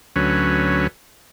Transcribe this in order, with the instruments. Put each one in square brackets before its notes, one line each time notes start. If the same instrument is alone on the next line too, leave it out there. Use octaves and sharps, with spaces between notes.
[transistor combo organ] D2 F#3 C#4 B4